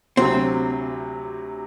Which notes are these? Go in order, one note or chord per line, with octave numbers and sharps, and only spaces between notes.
D2 C3 F#3 C4